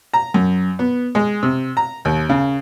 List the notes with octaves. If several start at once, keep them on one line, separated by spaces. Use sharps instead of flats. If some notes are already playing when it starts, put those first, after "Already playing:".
A#5
F#2
B3
G#3
C3
A#5
D#2
C#3